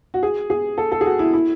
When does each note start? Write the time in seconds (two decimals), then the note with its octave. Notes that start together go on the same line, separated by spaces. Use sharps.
0.14 F#4
0.23 G#4
0.50 G#4
0.78 A4
0.92 A4
1.01 G#4
1.06 F#4
1.19 E4
1.33 E4